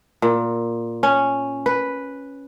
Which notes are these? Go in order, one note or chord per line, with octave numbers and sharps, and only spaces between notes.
A#2
C#4
B4